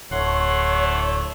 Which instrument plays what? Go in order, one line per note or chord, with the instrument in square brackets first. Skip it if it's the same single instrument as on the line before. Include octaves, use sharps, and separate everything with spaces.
[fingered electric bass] D1 [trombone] A3 [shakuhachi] C#5 [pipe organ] F#5 C6